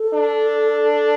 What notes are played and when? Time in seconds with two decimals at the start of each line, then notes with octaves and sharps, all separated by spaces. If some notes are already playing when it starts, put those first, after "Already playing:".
Already playing: A4
0.14 D4